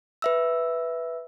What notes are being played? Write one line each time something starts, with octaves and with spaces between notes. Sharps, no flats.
B4 E5 E6